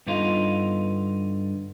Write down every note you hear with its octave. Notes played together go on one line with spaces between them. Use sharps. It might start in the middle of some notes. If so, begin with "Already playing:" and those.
G2 D3 B3 D#4 F4